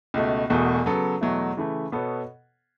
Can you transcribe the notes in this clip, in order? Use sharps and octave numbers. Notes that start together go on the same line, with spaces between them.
C#2 B2 A3
E1 E2 B2 A3
C#3 F#3 B3 A4
E2 B2 F#3 A3 E4
C#3 E3 A3
B2 B3 A4 C#5